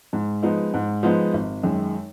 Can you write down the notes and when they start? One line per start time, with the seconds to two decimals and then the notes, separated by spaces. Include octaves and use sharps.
0.13 G#2
0.43 F3 G#3 B3 D#4
0.74 G#2
1.03 F3 G#3 B3 D#4
1.34 G#1
1.63 F#2 D#3 G#3